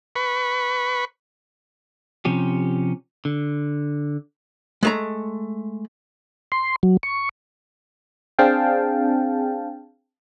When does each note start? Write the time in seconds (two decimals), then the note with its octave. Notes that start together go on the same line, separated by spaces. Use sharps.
0.16 B4 B5 C#6
2.25 C3 F3 C#4 G4
3.25 D3
4.83 G#3 A3 A#5
6.52 C6
6.83 F#3
7.03 C#6
8.39 C4 D4 G#4 F5 G5 A5